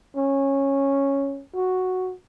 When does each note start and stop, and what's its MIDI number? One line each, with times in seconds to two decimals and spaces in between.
0.16 1.41 61
1.54 2.11 66